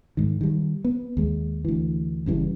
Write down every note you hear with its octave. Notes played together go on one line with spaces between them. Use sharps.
G#2 D#3
D#3 G3
B3
D#2 G#3
D2 E3
F#1 C#3 E3 G3